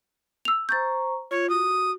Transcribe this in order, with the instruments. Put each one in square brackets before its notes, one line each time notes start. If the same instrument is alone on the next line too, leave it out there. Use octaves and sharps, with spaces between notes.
[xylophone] E6 F7
[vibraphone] C5 A#5 C#6 [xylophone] G6 A6
[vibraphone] F4 [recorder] C#5
[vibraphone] F#4 [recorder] D#6